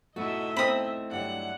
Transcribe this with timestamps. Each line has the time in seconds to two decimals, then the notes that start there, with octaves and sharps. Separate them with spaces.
0.16 A3 D#4 E4 F#4 D#5 E5
0.57 C4 B5 D#6
1.11 G2 D3 F#3 F#5